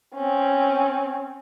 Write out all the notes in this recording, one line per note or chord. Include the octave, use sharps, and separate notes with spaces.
C4 C#4